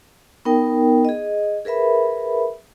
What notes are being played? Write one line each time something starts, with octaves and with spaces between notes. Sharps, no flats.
B3 D#4 A#4 G5
G#4 D#5
G#4 A#4 B4 E5 B5